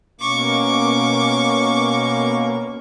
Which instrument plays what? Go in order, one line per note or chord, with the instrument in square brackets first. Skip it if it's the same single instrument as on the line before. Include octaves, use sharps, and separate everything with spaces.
[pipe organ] B2 A#3 [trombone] C#4 [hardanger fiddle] C#6 D6